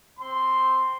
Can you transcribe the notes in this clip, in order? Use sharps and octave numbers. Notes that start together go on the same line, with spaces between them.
C4 C6